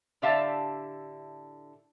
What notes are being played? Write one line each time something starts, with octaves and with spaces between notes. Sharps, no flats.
A2 D3 G4 E5 F5 A5